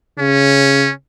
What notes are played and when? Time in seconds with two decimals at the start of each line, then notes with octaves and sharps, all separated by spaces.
0.18 C#3 C#4